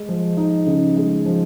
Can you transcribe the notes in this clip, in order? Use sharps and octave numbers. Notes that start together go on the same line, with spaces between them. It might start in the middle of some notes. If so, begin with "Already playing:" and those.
Already playing: G#3
F3
D#4
C#3
G#3
F3